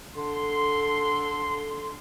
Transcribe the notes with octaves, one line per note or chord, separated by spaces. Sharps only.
D3 A4 C6